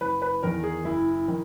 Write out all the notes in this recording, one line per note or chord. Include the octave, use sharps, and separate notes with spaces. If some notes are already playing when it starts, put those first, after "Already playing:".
F#1 B4
B4
E2 D#3 A#4
G#4
F#1 E4
D#3